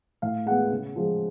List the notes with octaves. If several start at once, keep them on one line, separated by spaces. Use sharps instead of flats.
A2 F5
G#3 B3 F#5
C#3
F3 G#3